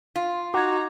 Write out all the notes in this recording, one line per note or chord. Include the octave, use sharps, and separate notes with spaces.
F4
D#4 F#4 A#5 D6 G#6